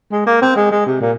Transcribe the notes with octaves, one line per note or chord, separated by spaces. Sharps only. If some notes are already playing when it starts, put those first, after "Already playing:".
G#3
A#3
C4
G#3
G#3
C3
A#2